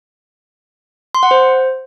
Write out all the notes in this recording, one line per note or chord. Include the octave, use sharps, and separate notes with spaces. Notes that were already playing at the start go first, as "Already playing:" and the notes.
C6
F#5
C5